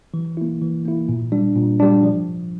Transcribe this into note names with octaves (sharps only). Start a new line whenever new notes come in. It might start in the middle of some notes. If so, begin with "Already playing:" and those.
E3
A#3 E4
E3
A#3 E4
A#2
G3 D4
A#2
G3 D4
F3